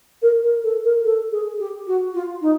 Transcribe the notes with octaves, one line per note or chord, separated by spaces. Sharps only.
A#4
A#4
A4
A#4
A4
G#4
G4
F#4
F4
D#4